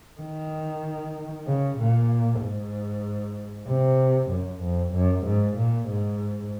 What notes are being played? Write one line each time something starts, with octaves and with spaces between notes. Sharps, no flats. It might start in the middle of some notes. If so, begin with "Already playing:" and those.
D#3
C#3
A#2
G#2
C3
F#2
F2
F#2
G#2
A#2
G#2